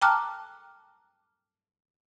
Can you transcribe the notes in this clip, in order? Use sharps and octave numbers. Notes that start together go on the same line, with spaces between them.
G5 A5 A#5 D6 F6 F#6